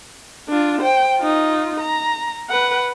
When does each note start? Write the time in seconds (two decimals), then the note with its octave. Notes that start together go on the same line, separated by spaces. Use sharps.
0.49 D4 F4
0.81 C5 G5
1.18 D#4 F4
1.80 A#5
2.49 B4 F#5